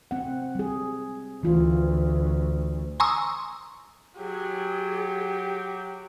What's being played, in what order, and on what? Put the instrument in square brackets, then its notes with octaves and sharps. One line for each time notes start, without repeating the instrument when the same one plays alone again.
[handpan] C4 F#5
G3 G#4
[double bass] D2 [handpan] E3 F4
[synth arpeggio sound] G#5 A#5 C6 C#6 D#6 E6
[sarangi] F#3 [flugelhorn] G4 [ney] G#4